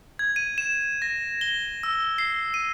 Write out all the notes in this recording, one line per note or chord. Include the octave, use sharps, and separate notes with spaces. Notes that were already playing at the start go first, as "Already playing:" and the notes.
G#6
D#7
E7
A#6
G7
E6
C7
D#7